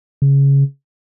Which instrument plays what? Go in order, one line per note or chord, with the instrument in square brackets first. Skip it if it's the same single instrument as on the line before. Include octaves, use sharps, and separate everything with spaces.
[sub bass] C#3